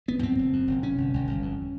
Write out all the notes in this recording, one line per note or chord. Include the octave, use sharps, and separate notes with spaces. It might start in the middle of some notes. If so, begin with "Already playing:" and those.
F#1 B3
F#2 C4
F#1
F#2
F#1
C3 C#4
G1
G1
G1
F2